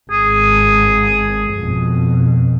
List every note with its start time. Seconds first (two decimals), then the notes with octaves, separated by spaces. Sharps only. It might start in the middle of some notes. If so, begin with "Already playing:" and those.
0.11 G#1 G#4
1.53 F2 B2